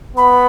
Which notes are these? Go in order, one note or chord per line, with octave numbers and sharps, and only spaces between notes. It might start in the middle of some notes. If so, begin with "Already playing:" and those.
B3 B5